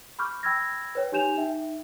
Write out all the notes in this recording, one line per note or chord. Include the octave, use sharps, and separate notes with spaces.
B5 C#6 D6 F6 G6
G5 B5 E6 F6 G#6 A#6
B4 C#5 G5
D#4 G4 G#5 G6 E7 F7
D#4 E5 G5